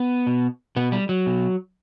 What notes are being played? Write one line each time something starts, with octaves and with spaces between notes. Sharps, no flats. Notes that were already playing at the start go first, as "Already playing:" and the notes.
Already playing: B3
B2
B2 B3
G3
F#3
B2